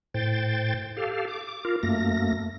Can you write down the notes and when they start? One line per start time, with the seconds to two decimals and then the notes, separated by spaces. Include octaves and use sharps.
0.14 A2 C5 G5 A6
0.97 G4 A4 F5
1.28 D6
1.65 F4 A#4
1.83 F#2 A3 A#3 A#6